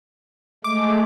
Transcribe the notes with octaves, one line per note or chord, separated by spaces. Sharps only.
G#3 A3 D6